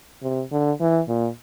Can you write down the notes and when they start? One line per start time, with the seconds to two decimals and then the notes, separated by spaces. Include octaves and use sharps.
0.23 C3
0.52 D3
0.81 E3
1.08 A#2